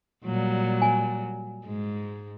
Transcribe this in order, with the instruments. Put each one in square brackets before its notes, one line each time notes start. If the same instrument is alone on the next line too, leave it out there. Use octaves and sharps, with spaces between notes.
[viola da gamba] A#2 F#3 G3
[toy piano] G#5
[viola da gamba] G#2 G#3